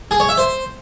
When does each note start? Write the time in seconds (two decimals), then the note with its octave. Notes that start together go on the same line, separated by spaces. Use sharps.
0.11 G#4
0.20 C#5
0.29 E5
0.38 C5